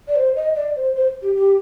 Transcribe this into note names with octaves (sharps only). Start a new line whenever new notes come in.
D5
C5
D#5
D5
C5
C5
G4
G4